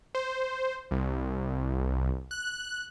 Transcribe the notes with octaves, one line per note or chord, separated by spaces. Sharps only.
C5
C2
F#6